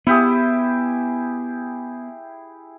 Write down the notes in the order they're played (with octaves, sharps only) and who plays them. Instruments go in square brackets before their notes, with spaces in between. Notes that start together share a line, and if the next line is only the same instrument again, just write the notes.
[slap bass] B3 [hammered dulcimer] E4 G4 G#4